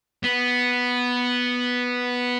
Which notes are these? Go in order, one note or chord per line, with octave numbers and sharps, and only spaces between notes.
B3